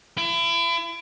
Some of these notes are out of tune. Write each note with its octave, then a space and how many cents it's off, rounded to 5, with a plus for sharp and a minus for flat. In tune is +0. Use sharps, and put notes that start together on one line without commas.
E4 +35